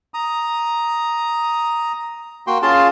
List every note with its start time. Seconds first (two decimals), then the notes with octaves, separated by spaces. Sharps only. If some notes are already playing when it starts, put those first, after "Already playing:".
0.14 A#5 D#6
2.47 A#3 F#4 G5 C6
2.62 C#4 F4 G#4 F5 A5 C6